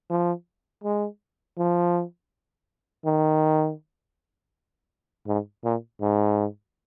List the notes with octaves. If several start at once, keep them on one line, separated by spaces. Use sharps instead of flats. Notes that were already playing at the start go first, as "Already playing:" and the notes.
F3
G#3
F3
D#3
G#2
A#2
G#2